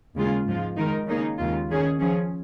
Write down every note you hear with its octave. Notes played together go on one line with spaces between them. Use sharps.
D#2 C#3 G#3 F4 G#4
G#2 F3 G#3 F4
D#3 G#3 D#4 A#4
C#3 A#3 D#4 G#4
D#2 C#3 G#3 F4
D#3 C#4 G#4
F3 C#4 G#4